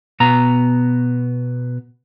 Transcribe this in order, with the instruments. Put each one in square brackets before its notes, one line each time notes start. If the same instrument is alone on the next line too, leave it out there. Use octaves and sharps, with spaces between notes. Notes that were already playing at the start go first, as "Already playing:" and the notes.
[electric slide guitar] B2 B3 A#5